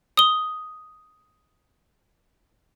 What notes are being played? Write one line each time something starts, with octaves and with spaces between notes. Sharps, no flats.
D#6 G7